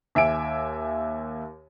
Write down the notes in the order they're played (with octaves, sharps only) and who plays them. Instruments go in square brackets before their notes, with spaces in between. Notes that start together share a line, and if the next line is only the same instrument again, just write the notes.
[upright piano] D#2 E5 G#5 D7